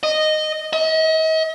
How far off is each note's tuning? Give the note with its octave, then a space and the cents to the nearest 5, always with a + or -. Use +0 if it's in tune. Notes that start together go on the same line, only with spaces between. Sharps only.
D#5 -10
D#5 +40